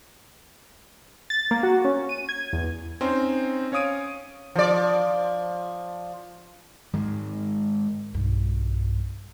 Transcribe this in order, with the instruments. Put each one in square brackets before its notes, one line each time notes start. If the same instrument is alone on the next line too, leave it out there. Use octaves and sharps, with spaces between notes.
[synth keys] A6
A#3
F#4
C#4
D#7
G#6
E2
[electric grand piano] C4 C#4 D#4 C5
C#4 C#5 F5 D#6 D7 D#7
[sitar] F3 D5
[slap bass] G#2 D#3 G#3
[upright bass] B1 G2